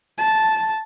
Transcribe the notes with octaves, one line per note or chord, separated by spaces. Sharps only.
A5